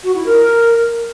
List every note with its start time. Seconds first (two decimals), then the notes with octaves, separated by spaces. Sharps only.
0.04 F#4
0.15 E4
0.26 A#4